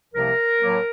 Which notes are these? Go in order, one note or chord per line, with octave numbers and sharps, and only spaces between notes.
C2 C3 F3 A#3 A#4
A2 F#3 A#3